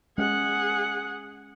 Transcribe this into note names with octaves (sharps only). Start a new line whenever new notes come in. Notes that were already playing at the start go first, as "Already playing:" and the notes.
G#3 C#4 G#4 F#5